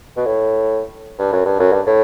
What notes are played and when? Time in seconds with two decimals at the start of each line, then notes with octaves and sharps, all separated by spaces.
0.17 B2
0.26 A2
1.19 G2
1.32 F#2
1.45 G2
1.59 F#2
1.72 G2
1.86 A2